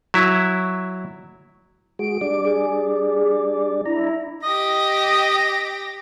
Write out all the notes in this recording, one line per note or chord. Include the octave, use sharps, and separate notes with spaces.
F#3 E4
G#3 F#4 G#4 D7
G3 D4 D5
G#4
D4 E4 A#5
G4 D#5 A#6